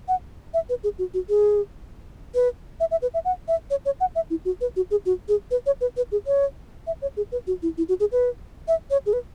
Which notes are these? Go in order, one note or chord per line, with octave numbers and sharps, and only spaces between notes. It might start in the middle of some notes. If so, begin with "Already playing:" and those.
F#5
E5
B4
G#4
F#4
F#4
G#4
B4
E5
E5
B4
E5
F#5
E5
C#5
C#5
F#5
E5
E4
F#4
B4
F#4
G#4
F#4
G#4
B4
C#5
B4
B4
G#4
C#5
E5
C#5
G#4
B4
F#4
E4
E4
F#4
G#4
B4
E5
C#5
G#4
B4